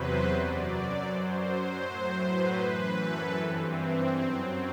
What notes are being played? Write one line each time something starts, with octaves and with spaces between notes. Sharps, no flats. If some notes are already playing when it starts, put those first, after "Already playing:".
Already playing: E2 C3 F#3 B4 C5
F#2 F#3 D5
F#2 F#3 C5
C5
A2 F#3
B4
F#2 E3
A4
G2 E3 C4
F#2 F#3